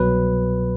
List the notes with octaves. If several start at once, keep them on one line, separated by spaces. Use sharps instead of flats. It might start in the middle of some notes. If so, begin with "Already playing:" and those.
Already playing: C2 B2 F#3 B4